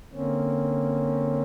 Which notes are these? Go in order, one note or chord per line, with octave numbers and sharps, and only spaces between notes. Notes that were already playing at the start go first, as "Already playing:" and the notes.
D3 A#3 C4 C#4